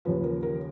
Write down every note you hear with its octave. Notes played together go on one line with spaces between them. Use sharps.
D#2 C#3 F3 B4
A#4
A#4